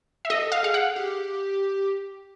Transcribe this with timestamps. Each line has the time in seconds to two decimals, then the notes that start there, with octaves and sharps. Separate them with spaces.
0.25 E5
0.30 A4 D#5
0.52 F5
0.63 G#4 F5
0.74 F#5
0.96 G4